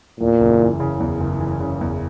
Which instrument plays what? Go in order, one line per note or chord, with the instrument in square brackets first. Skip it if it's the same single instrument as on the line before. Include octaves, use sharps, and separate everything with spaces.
[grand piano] E2 [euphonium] A#2
[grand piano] F#1
E3
C#3
E2
F#1
E3
C#3
E2